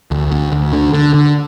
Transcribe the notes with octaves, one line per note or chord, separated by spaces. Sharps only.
D2
D2
D2
D3
D3
D3